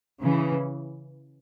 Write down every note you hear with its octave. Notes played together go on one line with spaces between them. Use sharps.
C#3 E3